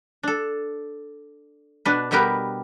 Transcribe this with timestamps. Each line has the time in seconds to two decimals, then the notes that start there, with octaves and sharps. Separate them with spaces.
0.23 D4 A4
1.85 B2 D4 B4
2.11 B2 G3 B3 G4 A#4 B4